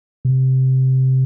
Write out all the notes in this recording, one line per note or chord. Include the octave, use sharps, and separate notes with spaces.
C3